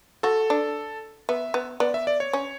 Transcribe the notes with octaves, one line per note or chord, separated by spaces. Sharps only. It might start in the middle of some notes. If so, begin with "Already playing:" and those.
F#4 A4
D4
B3 E5
B3
B3 D5
E5
D5
C#5
C#4